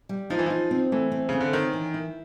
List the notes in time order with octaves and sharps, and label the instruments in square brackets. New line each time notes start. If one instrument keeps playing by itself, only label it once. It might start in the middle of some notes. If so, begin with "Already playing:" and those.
[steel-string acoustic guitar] G3
[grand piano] F3 [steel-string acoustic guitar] D#4
[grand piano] E3
[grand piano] F3 [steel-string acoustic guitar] D#4
[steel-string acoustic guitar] C4
[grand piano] E3 [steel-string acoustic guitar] A3
[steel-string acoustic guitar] C4
[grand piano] C#3 [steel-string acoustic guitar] C4
[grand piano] D3
[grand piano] D#3 [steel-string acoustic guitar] C#4
[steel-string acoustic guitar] E3
E4